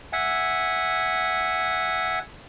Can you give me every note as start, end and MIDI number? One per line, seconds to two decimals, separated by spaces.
0.13 2.19 76
0.13 2.19 78
0.13 2.19 80